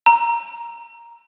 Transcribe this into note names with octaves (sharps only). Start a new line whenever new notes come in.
A#5